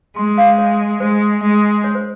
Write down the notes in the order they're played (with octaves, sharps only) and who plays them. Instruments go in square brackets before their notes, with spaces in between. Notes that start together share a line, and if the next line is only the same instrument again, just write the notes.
[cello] G#3 [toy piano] C6
[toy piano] F5
C#5
[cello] G#3 [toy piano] C5
[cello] G#3
[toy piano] C#5
C5